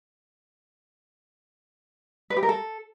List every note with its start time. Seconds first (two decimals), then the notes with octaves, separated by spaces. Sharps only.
2.30 B4
2.37 G4
2.43 A#4
2.49 A4